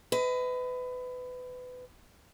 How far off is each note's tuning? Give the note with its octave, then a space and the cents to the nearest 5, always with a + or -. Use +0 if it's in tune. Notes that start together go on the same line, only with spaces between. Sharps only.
B4 +25 D#5 +30